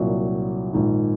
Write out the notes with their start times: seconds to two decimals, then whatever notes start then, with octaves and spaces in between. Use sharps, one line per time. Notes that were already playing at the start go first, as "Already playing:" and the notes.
Already playing: C2 A#2 F#3
0.73 A#1 G#2 D#3